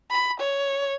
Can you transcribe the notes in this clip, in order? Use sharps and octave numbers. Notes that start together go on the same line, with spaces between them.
B5
C#5